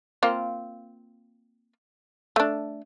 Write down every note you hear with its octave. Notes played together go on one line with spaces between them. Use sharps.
A#3 C4 F4
A3 D4